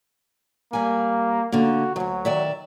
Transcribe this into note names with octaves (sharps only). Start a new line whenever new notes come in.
G3 A#3 G#5
D3 A#3 F#4
D2 D#3 F#3
D#3 D5 E5